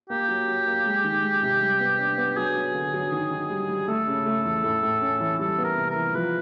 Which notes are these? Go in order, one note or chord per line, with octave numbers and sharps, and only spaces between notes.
A#3 G4
F#3
F#3
A#3
G#3
D#3
G#3
C3
G3
B3
D4
B3
F#3 G#4
F#3
D3
F#3
D#3
D#3
G3
G3
A3 A4
C#3
A3
E2
A2
A2
C#4
E3
G3 A4
B3
A#4
C3
A#4
E3
F3 B4